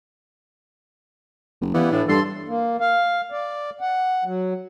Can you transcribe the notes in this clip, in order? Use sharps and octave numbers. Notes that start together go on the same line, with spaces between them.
F#1
E3 G3 A#3 B3
A2 D4
G2 A4 C6
A#3
F5
D5
F#5
F#3